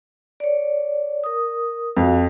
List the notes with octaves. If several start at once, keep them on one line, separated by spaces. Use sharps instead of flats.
C#5 D5
A#4 D#6
F2 F#4 F5